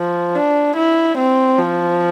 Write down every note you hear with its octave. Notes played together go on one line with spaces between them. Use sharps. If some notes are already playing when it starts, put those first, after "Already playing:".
Already playing: F3
D4
E4
C4
F3